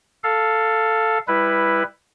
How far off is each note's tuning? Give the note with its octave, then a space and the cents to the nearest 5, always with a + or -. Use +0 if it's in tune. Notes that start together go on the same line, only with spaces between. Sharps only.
A4 +5 F5 +0
G3 +25 E4 +5 B4 +0